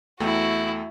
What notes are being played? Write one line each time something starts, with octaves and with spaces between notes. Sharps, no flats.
E2 A3 E4 F#4 G5